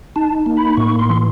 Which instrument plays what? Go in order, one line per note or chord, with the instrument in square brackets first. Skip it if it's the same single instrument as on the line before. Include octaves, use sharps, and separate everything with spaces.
[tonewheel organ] D#4 A5
A#3
B5
A2 C#6
C6
E3